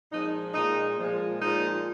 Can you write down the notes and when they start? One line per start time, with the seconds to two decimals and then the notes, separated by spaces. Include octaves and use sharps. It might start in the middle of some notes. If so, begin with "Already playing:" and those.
0.12 A#2 F3 G#3 D#4
0.54 A#2 G#3 D#4
0.98 A#2 F3 G#3
1.40 A#2 F3 G#3 D#4